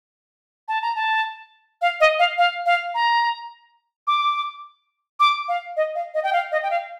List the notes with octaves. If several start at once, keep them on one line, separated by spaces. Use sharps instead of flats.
A5
A#5
A5
F5
D#5
F5
F5
F5
A#5
D6
D6
F5
D#5
F5
D#5
G5
F5
D#5
G5
F5